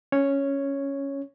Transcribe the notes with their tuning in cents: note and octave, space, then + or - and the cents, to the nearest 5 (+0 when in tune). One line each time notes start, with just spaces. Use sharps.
C#4 +0 C#5 +0